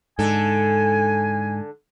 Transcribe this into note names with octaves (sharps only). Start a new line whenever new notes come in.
G#2 D3 A4 G#5